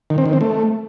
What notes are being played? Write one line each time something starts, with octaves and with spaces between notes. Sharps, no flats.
D#3
C4
D#3
C4
A3